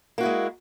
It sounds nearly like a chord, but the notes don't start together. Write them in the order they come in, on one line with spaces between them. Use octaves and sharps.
A#3 F#4 E4 G#3